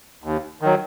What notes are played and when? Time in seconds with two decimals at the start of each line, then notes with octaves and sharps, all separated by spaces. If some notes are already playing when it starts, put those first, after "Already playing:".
0.24 D#2
0.61 D#3 F#3